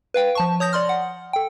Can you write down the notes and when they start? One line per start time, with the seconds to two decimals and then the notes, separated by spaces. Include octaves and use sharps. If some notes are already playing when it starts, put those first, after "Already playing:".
0.14 B4 F5 G5
0.35 F3 A5 C#6
0.60 C#5 D#6 G6 A#6
0.73 D5 C6 F6
0.89 F#5
1.33 A4 G5